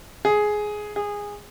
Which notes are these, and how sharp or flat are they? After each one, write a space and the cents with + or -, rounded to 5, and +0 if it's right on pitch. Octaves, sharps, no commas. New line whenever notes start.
G#4 +10
G#4 -15